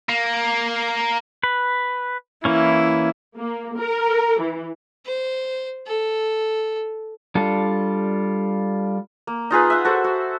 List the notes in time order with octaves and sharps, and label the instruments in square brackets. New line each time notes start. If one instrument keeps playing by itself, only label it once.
[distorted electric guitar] A#3
[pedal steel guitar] B4
[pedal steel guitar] E3 A#3 C#4 [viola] E4
[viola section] A#3
A#4
E3
[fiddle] C5
A4
[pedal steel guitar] G3 D4 F4 A4
[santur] A#3
D#4 F4 G#4 B4
E5 F#5
F#4 A4 C5
F#4